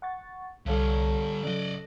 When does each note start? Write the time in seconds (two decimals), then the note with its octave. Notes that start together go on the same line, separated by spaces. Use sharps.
0.02 F#5 C#6 A6
0.66 C2 D3 G3 A4 C#5 F5
1.43 C#3 F#3 D5 D#5 E6 F#6 A#6